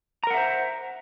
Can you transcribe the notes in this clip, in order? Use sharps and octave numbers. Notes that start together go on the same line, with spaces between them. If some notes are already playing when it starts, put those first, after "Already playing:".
A#4 C5 E5 F#5 A#5